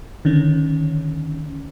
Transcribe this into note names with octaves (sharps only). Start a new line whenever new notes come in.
D3 D#3 C#4